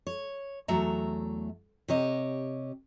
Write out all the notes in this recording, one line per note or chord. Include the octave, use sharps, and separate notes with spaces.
C#5
E2 F#3 A3 E5 A#5
C3 G4 C#5 D#5